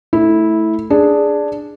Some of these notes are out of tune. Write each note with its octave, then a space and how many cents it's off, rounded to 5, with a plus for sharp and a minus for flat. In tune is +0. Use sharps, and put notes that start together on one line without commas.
A3 +0 E4 -15
D4 +0 G#4 +0